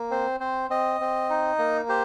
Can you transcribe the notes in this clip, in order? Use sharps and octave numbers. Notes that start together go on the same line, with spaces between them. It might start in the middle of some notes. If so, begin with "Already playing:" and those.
Already playing: A#3
C4 C5
C4 C5
C4 D#5
C4
D#4
A#3
G4 C5